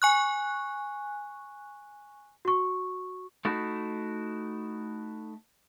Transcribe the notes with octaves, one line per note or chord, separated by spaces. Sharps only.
G#5 C#6 F#6
F#4 C#6
A3 D#4 E4 F#4